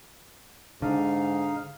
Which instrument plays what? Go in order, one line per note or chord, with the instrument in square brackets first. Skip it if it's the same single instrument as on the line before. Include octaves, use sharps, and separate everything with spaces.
[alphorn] G#2 [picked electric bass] D3 [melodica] D#4 F5